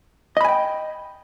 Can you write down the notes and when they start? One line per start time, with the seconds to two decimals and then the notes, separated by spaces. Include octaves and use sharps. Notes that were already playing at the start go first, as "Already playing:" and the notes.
0.37 D#5
0.41 B5
0.45 G#5
0.49 G5